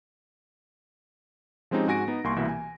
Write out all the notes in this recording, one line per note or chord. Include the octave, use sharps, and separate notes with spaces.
F3 G#3 C4 C#4 D#4 G4
G#2 F#4 G#5 A#6 D7
B3 D#4
C2 A#3 G#5 C6 C#6
C2 B2 E3 A#3 E5
G#5